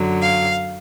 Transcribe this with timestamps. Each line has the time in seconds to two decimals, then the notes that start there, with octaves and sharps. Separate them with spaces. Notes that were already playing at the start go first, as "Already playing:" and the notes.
Already playing: F#2 D3 F#3
0.21 F5